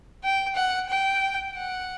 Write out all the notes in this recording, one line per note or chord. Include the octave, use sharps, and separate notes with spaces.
G5
F#5
G5
F#5